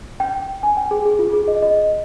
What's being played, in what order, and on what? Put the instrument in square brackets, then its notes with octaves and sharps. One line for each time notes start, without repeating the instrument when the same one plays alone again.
[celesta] G5
G#5
G5
G#4
G#4
F4
G#4
D#5
D#5